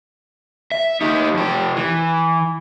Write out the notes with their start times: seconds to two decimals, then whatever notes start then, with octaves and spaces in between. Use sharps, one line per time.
0.72 E5
1.01 D#4 G4
1.34 F2 G4
1.76 E3